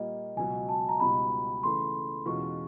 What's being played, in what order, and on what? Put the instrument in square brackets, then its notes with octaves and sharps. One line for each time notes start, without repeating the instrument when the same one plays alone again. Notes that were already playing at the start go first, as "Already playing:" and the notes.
Already playing: [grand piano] A#2 G3 A#3 [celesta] D#5
[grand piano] C#2 B2 F#3 [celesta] G#5
[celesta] A5
A#5
[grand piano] C#2 B2 G3 B3 D#4 [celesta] B5
[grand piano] C#3 E3 A3 [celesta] C6
[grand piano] E2 B2 G#3 C#4 F4 [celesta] C#6